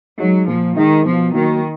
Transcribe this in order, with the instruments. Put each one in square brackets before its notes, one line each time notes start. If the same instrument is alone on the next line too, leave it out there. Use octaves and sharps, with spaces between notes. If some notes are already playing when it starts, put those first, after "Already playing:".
[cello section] F#3 [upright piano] G#3 D#4
[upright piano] A#2 [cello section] F3
[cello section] D#3 [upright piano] G#3 D#4
[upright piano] B2 [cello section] F3
[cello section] D#3 [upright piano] F#3 A#3